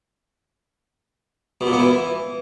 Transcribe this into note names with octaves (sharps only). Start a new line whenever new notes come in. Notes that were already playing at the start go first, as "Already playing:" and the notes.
B2
A#2
B3
E3